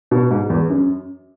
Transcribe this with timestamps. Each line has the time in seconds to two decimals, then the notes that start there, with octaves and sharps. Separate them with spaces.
0.11 B2
0.31 G#2
0.50 E2
0.70 F#2